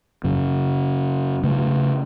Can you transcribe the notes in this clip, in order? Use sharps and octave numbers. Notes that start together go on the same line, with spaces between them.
F#2 C#3
C#3 A3